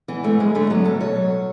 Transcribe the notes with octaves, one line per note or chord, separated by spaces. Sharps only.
E3 B3
G#2 A3
G#2 G#3
D3 A3
F#3 B3
D2 A4
B2 C#5
F#3